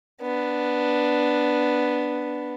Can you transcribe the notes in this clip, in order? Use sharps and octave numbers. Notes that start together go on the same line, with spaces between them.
B3 D4